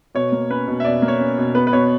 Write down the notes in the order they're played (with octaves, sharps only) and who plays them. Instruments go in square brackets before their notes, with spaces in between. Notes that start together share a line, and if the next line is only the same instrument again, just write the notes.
[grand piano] B2 C#5
A#3
C#4 B4
B2
E5
B2 D5
A#3
C#5
C#4
B2
B3 B4
B4
B2 C#5